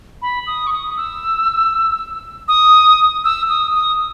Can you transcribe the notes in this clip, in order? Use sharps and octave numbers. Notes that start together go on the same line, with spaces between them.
B5
D#6
C#6
D#6
E6
D#6
E6
D#6
D#6